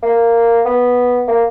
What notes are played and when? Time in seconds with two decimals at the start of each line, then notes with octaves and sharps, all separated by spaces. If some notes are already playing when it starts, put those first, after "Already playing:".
0.02 A#3
0.65 B3
1.28 A#3